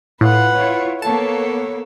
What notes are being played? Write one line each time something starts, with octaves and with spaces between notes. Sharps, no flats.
A2 F4 B4 F#5
E4 F4 C#5
A#3 B3 A4 C#5 A5